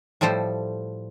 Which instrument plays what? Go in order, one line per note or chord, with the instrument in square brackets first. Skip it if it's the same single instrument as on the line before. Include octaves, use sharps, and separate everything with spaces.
[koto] A2 F3 G3 A4 C5